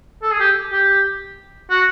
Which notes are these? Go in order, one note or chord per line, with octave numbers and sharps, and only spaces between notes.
A4
G#4
G4
G4
F#4